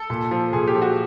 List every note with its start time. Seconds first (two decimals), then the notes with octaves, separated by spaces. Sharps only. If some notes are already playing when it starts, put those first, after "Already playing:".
Already playing: A4
0.10 A#2
0.31 F3
0.53 A#2 G#4
0.67 G4
0.75 F3
0.82 F#4